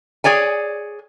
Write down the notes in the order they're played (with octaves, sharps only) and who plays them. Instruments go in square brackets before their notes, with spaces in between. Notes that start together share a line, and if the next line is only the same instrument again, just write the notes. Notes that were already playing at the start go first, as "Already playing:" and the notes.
[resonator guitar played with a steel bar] G#4 C#5 D5 G#5